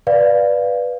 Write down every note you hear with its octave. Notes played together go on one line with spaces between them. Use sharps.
B4 D5 F5